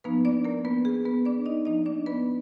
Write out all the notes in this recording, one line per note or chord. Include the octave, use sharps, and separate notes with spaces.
F3 A#3 B3 D#4 B4
D4 D5
A#3 A#4
B3 B4
G#4
B3 B4
D4 D5
D#4 D#5
F3 A#3 D4 D#4 D#5
D4 D5
B3 B4